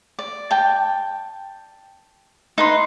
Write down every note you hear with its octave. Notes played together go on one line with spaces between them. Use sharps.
D5
G5 A5
D#4 B4 C6